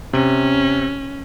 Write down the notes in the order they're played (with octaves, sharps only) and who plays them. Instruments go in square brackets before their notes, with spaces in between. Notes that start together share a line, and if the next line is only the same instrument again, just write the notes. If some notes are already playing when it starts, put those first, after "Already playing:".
[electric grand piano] C3 [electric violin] C#4